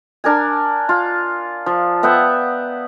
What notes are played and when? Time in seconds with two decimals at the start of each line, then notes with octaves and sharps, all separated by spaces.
0.24 D4 A#4 G#5
0.89 F4
1.66 F3
2.03 B3 E5 F#5 G5